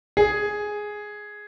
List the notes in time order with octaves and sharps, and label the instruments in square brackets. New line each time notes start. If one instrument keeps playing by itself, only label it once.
[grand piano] G#4